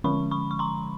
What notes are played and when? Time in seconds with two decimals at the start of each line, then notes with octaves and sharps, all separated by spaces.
0.04 D3 F3 G#3 C#4 B5 C#6
0.31 B5 C#6
0.51 C#6
0.59 A#5 C6